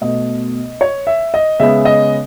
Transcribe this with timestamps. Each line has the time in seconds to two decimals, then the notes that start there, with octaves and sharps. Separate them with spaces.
0.01 B2 A3 D#5
0.81 C#5
1.07 E5
1.34 D#5
1.60 C#3 G#3 B3 E5
1.85 D#5